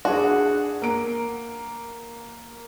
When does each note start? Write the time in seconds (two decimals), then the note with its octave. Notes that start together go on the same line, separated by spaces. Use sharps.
0.05 D4 F#4 G#4
0.82 A#3 D7